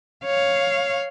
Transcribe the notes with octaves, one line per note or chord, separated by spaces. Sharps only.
C#5 F5